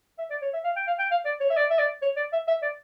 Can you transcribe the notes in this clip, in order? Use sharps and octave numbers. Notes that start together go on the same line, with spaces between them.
E5
D5
C#5
E5
F5
G5
F5
G5
F5
D5
C#5
E5
D5
E5
D5
C#5
D5
E5
E5
D5